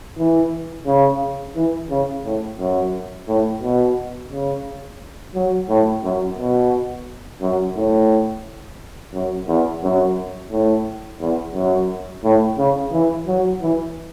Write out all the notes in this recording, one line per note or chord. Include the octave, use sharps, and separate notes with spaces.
E3
C#3
E3
C#3
A2
F#2
A2
B2
C#3
F#3
A2
F#2
B2
F#2
A2
F#2
E2
F#2
A2
E2
F#2
A2
C#3
E3
F#3
E3